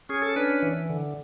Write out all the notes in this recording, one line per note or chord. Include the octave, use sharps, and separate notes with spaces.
C#4 G#4
A4
D4 B4
E3
D3